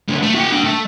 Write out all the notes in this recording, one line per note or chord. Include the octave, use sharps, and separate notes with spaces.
C#2 D3
A3
F#4 G5
D4 G5
A3